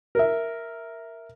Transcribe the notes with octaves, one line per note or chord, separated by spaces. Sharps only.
A#4 E5